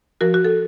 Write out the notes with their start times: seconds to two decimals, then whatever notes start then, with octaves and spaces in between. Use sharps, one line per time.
0.21 F3 F#4 A#4
0.34 F#4
0.45 A4